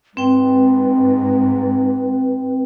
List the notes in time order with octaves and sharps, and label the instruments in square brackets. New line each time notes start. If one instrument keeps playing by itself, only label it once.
[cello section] G#2 [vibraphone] C4 G5 [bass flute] B4